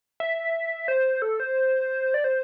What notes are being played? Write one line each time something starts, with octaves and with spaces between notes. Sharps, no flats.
E5
C5
A4
C5
D5
C5